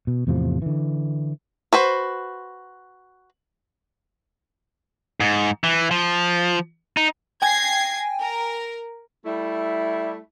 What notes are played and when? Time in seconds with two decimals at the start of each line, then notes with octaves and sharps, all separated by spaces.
0.07 B2
0.27 E2 A2 C3 F3
0.62 D3 E3
1.73 F#4 B4 C5
5.20 G#2
5.64 E3
5.91 F3
6.97 D#4
7.42 G5 G#5 G#6 A#6 C7
8.21 A#4
9.25 G3 A3 E4